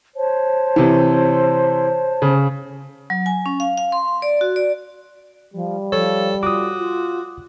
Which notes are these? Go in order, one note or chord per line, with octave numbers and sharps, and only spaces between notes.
C5 C#5 A5
C3 E3
C#3
F#3
G#5
C#4
F5
F5
C6
D5
F#4
D5
F3 G3
F3 A4 C#5
F4 F#4 D6 D#6
F4